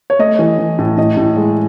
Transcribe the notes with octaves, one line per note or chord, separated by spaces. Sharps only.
C#5
A3 D#5
E3
E3
A2
A2 D#5
A2
G#3